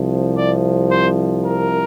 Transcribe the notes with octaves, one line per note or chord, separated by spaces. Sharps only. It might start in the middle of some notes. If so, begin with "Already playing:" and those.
Already playing: C2 C3 F3
D5
C5
A#4